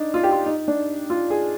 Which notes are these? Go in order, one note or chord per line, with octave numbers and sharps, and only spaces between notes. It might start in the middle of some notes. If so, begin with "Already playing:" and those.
Already playing: D4 D#4
F4
G4
F4
D#4
D4
F4
G#4